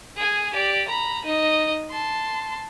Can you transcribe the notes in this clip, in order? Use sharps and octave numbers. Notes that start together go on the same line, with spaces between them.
G#4 G#5
G4 D5
A#5 B5
D#4 D#5
A5 C6